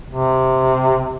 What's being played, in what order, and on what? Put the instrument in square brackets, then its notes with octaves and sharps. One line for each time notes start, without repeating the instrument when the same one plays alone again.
[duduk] C3